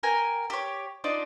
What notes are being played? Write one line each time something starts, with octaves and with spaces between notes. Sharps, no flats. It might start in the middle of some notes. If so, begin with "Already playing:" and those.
A#4 G5 G#5
G4 C#5
D4 D#4 F4 D5